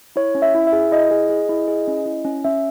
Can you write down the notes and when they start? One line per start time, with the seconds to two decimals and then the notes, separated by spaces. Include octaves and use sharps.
0.16 E4 C#5
0.35 C#4
0.42 E5
0.54 E4
0.67 E5
0.73 G#4
0.92 E4 D#5
1.11 G#4
1.29 G#4
1.49 E4
1.68 G#4
1.88 C#4
2.06 E4
2.25 C#4
2.45 C#4 E5